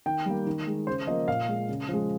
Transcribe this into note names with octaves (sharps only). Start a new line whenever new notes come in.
D#3 G5
G3 A#3
D#3
G#3
C#3 C5
F3 A#3 D#5
A#2 F5
G#3
C#3
F3
G#3